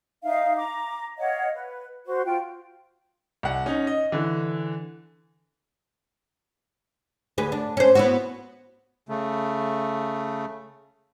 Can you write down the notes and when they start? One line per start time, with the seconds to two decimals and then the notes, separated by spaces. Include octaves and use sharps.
0.23 D#4 E5 F5
0.57 A#5 D6
1.18 C#5 D#5 F5 F#5
1.55 B4
2.06 F#4 C5
2.25 F4 G5
3.43 C2 F#5
3.66 C#4 D#4
3.87 D#5
4.12 D3 E3
7.38 D2 G#4 B4
7.52 D4
7.77 C#4 C5
7.95 B3 E4 F#4
9.09 C#3 A3